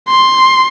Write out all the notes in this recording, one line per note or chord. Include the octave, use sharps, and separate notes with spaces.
C6